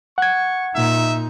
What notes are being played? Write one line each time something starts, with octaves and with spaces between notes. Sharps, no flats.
F#5 C#6 G#6
A#2 D#4 E5